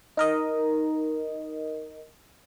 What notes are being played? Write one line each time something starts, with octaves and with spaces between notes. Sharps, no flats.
D#4 A#4 D#5